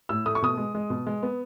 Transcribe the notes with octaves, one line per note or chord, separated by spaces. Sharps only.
A2 E6
A3 D#6
C#6
B2 D#6
G#3
G#3
B2
G#3
B3